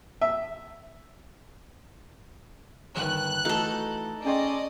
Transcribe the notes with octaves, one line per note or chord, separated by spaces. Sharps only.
E5
G1 D#3 F#6
E3 A3 D#4 F#4 A4
C#4 G#4 D5 D#5 G5 C6